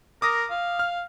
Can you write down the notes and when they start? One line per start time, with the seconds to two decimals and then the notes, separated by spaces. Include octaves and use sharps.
0.22 A#4 D6 D#6 A#6
0.50 F5
0.79 F6